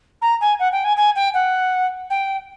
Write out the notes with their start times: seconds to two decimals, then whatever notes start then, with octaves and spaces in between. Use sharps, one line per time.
0.22 A#5
0.41 G#5
0.59 F#5
0.72 G5
0.84 G#5
0.97 G#5
1.16 G5
1.34 F#5
2.10 G5